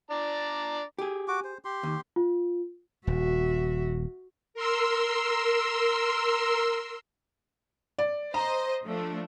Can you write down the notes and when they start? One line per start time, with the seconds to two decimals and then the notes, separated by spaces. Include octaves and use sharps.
0.11 D4 D5 A#5
0.98 G4 G#4
1.28 F#4 D6
1.44 C5
1.65 G4 C6
1.83 D#2
2.16 F4
3.07 D#1 F#4 E5
4.54 A#4 C6 E6
7.99 D5
8.34 C5 D#5 A#5
8.84 F3 A3 D4